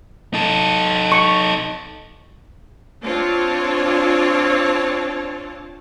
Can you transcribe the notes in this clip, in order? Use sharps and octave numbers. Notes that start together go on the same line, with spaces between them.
D#4 A4
C#6
C4 D4 F4 C#5 A5